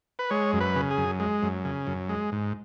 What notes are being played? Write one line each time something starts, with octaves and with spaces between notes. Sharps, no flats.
B4
G#3 C#5
F#2
B4
C#3
G#4
F#2
G#3
F#2
C#3
F#2
G#3
G#2